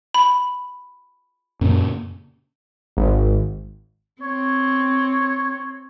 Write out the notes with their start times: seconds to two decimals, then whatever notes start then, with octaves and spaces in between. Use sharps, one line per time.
0.14 B5
1.61 F#2 A#2 C#3
2.97 G#1
4.22 C4 C#5